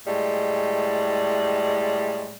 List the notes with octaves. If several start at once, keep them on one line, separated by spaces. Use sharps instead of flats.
A2 G3 G#3